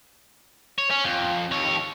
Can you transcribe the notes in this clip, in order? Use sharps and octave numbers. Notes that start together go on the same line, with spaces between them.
C#5
C#4
F2
D#2 C#5